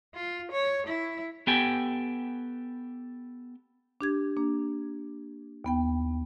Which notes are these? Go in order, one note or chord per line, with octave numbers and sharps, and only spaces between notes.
F4
C#5
E4
B3 G4 A4 G5 G#5
D4 G4 G#6
A#3 D4
D#2 B3 G5